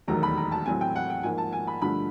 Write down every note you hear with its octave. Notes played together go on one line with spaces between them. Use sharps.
E1 D#2 D#3 F#3 A3 A#5
B5
A#5
A5
A2 F#3 A3 C4 G#5
G5
F#5
G5
G#2 F3 A#3 G#5
A5
G#5
B5
G2 D3 F3 A3 B5